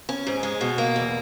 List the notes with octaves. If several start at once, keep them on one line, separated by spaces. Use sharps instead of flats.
C#4
G#2
G#3
B2
A#3
E2